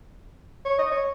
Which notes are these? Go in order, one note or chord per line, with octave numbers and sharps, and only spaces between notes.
C#5
D#5
C#5